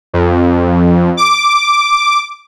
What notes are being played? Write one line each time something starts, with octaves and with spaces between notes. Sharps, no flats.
F2
D6